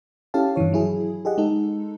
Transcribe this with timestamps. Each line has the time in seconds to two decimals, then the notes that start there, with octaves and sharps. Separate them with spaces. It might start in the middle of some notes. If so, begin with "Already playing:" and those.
0.34 C#4 E4 G4 A4 F5 A5
0.56 G2 D#3 E3 C#5
0.73 F#3 E4 G#4
1.25 G4 G#4 D#5 F#5
1.38 G#3 D#4 A4